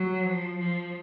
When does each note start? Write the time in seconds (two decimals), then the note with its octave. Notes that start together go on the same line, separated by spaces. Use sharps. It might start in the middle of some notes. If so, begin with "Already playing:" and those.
Already playing: F#3
0.26 F3
0.58 F3